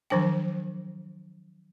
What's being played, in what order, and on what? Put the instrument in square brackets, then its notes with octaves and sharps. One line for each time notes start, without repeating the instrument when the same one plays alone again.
[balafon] D#3 F3 F#3 D4 G5